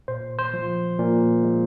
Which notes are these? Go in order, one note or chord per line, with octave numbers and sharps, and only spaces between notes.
A#2 C5
C5
F3
A#2
G#3